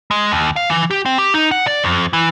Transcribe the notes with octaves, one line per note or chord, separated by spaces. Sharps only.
G#3
D#2
F5
E3
G4
C4
G4
D#4
F#5
D5
F2
E3